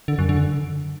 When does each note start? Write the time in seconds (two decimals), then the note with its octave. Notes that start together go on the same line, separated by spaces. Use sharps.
0.08 D3
0.19 F#2
0.29 D3